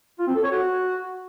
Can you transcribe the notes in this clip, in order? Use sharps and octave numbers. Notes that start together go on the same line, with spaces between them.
F4
C4
A4
C#5
F#4